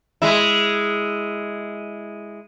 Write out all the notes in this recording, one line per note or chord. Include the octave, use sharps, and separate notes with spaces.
G#3 E4